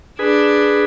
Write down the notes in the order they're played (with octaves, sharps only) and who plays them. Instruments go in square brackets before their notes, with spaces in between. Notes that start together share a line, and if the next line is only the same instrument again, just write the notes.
[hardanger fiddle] D4 [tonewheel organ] G#4 B4